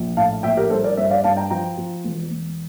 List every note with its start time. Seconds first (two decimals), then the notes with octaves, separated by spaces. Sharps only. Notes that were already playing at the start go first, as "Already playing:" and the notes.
Already playing: A#1
0.17 A2 F5 A5
0.43 A#1 E5 G5
0.57 G4 A#4
0.70 G3 A4 C5
0.84 A#4 D5
0.97 G2 C5 E5
1.10 D5 F5
1.24 G2 F5 A5
1.36 G5 A#5
1.50 F3 G5 A#5
1.78 F3
2.04 E1
2.31 E1